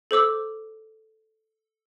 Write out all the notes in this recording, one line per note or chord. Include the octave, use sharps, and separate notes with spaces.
A4 C5 D6 E6